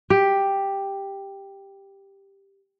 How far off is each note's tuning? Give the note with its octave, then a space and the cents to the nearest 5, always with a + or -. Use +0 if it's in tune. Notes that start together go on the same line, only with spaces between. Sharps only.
G4 +5